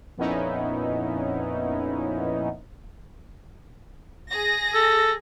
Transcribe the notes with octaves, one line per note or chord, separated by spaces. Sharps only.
F2 A#2 B3 C#4 D#4 E4
G#4 A#6
A4